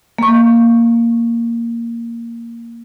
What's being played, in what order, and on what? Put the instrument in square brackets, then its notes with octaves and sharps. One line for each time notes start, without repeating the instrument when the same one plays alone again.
[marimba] A#3 C#6